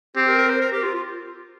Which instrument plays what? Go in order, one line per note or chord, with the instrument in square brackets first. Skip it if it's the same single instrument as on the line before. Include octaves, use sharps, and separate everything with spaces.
[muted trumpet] C4 [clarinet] G4
[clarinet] A#4
A#4
C5
A#4
G4
F4
F4